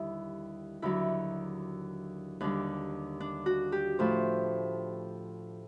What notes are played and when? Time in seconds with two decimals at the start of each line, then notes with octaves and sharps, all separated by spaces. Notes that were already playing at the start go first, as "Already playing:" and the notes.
Already playing: D#2 D3 G3 E4
0.82 D#2 D3 F#3 E4
2.40 D#2 D3 G3 D4
3.20 D4
3.46 F#4
3.72 G4
3.99 A2 F3 C5